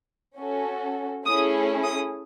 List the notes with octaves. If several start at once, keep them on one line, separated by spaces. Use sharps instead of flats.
C#4 F#4 A4
A3 C#4 E4 G#4 D#6
D#6